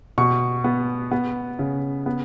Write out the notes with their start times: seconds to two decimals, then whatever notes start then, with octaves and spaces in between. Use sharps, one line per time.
0.18 B2 C#6
0.64 B3
1.11 B3
1.59 C#3
2.06 B3